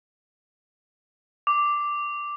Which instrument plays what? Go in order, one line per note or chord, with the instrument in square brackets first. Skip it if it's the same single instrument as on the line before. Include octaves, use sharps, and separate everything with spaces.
[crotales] D6